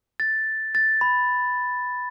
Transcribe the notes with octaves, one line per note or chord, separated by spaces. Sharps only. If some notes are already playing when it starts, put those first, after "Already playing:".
A6
A6
B5